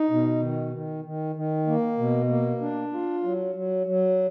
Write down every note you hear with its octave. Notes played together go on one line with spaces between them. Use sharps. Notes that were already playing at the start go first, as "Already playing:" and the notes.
Already playing: D#4
B2
D#3
D#3
D#3
D#3
A#3
B2
A#3
D4
F4
F#3
F#3
F#3